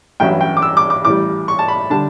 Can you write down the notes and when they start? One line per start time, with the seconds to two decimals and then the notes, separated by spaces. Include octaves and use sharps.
0.20 A1 G2 F#3 C#4 E4 G5
0.41 G5
0.57 D6
0.62 E6
0.77 D6
0.90 D6
1.05 A1 A2 G3 D6
1.48 C#6
1.59 A5
1.68 B5
1.90 D3 G3 D4 A5